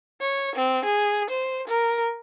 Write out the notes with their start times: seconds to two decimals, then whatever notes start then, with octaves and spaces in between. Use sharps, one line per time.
0.21 C#5
0.56 C4
0.85 G#4
1.30 C5
1.68 A#4